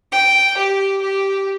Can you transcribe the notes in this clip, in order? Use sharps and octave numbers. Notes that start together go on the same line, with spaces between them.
G5
G4
G4